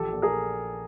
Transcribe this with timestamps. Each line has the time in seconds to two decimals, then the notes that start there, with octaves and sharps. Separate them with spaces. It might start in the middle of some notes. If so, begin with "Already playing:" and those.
Already playing: A#1 G4 A4
0.12 A#2
0.22 G#4 A#4